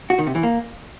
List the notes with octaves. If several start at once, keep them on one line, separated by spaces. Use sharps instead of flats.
F#4
D#3
C3
E3
A#3